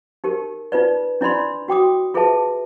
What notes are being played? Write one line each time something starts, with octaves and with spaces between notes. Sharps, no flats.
D#4 G4 A#4
D#4 F4 B4 D5
D4 E4 D5 B5 C6
F#4 G5 D6 D#6
F4 G#4 A4 B4 E5 A5